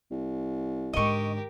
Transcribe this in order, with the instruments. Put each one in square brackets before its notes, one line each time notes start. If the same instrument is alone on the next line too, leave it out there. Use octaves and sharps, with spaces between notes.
[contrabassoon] C2
[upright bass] G#2 D3 [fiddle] G4 A#4 [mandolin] D#5 C#6